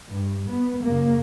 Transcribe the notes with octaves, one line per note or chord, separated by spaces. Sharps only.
G2
B3
F#2 C#3 A#3